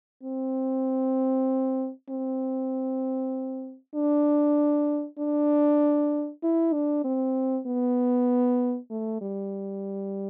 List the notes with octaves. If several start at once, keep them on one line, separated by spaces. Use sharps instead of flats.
C4
C4
D4
D4
E4
D4
C4
B3
A3
G3